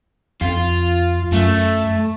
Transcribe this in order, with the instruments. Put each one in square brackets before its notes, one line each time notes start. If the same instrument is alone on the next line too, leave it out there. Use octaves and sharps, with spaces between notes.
[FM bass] F2 [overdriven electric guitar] F4
[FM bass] F#2 [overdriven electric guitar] A3